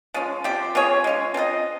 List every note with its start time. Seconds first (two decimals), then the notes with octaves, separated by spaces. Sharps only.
0.14 F3 G#3 C#4
0.44 F3 C4 G4
0.75 C4 F4 G#4 C#5
1.04 G#3 C#4 F4
1.34 C4 F4 A#4 D#5